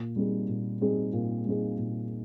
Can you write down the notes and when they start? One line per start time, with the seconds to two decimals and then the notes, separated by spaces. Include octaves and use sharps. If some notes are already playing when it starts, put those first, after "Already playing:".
Already playing: A#2
0.16 G3 C4 D#4 G#4
0.48 A#2
0.81 G3 C4 D#4 G#4
1.13 A#2
1.45 G3 C4 D#4 G#4
1.78 A#2